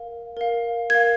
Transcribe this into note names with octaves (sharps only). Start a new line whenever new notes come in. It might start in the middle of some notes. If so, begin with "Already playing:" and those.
Already playing: A#4 F5
A#4 F5
A#4 F5 G#6